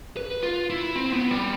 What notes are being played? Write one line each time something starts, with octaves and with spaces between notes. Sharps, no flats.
B4
F4
E4
C4
B3
G3